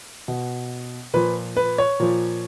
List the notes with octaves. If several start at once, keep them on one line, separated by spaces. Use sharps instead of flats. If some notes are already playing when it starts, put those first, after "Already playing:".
B2
A#2 F3 B4
B4
C#5
A#2 F3